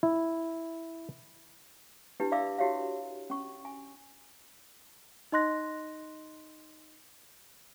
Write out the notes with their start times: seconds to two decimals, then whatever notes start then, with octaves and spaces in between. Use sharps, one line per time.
0.03 E4
2.20 D4 E4 G4 B4
2.32 D5 E5 F5 B5 D6 E6
2.58 E4 F#4 G4 C#5 E5 F5
3.30 C#4 C#6
3.65 G#5
5.32 D#4 D#5 C6 F#6 A#6